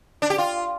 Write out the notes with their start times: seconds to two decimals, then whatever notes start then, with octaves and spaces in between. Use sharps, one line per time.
0.22 D4
0.30 G4
0.38 F4